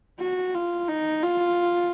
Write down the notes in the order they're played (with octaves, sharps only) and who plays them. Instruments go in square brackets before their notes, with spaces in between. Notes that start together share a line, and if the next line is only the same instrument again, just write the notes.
[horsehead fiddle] F#4
F4
D#4
F4